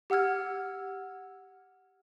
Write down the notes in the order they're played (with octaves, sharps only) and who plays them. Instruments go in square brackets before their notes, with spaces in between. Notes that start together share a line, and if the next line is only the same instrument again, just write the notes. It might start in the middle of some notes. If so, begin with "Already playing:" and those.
[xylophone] G4 F#5 E6 F6 G#6